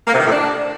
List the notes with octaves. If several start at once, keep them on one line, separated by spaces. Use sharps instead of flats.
A#3
C3
D#3
A2
D4